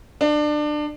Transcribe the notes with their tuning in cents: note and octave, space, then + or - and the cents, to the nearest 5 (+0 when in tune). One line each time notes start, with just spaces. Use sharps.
D4 +25